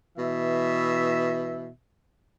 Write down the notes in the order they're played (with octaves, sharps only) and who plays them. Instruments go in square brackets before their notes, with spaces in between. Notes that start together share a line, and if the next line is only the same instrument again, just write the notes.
[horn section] B2 E3 E5